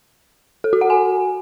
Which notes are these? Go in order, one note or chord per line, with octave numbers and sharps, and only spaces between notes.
A4
F#4
F#5
G#5